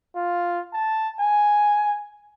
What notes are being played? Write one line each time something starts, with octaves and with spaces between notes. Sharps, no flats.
F4
A5
G#5